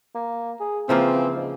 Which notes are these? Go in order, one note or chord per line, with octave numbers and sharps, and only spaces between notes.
A#3
G#4
C#3 E3 F3 A#3 C4
G#2